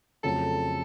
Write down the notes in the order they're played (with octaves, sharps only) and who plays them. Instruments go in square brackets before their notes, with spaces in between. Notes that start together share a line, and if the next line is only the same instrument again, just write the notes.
[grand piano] F2 C#3 F#3 A3 [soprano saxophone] A4